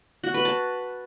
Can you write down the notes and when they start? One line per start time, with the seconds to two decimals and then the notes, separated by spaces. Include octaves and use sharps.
0.24 F#4
0.34 B4
0.45 A5